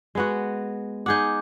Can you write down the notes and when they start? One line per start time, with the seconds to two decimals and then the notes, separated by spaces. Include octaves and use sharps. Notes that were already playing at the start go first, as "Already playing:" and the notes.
0.15 G#3 B3 F#4
1.06 D#4 G#4 F#5 D6 G6